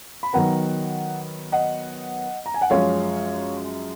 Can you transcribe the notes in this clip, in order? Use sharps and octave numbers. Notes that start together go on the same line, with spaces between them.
B5
D#3 F#3 B3 F#5 A#5
D#5 F#5
A#5
G#5
F#5
F#2 F3 G#3 C#5 F5